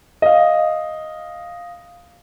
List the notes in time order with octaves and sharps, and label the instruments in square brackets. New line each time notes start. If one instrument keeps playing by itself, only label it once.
[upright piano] D#5 F5